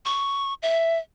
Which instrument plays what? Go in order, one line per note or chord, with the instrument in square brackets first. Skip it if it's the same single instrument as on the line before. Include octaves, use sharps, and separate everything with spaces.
[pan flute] C#6
E5